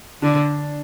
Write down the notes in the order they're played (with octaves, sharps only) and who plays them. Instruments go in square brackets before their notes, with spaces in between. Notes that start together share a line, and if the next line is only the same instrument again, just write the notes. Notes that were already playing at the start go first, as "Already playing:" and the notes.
[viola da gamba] D3 [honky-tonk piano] D4